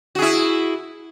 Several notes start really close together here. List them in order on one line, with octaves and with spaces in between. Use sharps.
F#4 G#4 E4